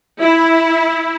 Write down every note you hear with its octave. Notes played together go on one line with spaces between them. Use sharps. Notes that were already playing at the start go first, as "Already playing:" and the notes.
E4